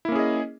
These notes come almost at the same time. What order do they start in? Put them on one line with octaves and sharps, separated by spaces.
E4 A#3 C#4 G#4 D#5